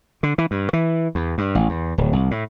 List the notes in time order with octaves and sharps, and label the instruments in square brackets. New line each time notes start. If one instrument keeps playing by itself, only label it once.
[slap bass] D3
E3
G2
E3
E2
G2
A1
E2
D1
C2
A2